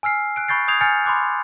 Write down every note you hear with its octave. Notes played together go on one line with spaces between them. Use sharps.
G#5 E6 F6 C7
F#6 D7
B5 C#6 G6 A6 C7
D#6 G6 G#6 C7 F7
G#5 F6 G6 A6 C#7
B5 C6 D6 F#6